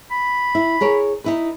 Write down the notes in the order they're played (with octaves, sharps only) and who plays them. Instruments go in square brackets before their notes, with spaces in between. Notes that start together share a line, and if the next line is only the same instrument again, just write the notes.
[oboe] B5
[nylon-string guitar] E4
G#4 A#4 C#5
D#4 E4 B4